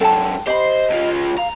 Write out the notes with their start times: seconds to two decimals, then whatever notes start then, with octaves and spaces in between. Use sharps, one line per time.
0.01 G#2 F#3 A4 G5 A5
0.47 G4 C5 D#5 B5
0.90 C#2 F4
1.38 F5 A#5